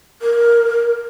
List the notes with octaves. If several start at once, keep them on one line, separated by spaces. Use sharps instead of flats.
A#4